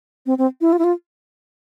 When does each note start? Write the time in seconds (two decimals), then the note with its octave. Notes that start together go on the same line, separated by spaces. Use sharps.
0.26 C4
0.38 C4
0.61 E4
0.73 F4
0.79 E4
0.84 F4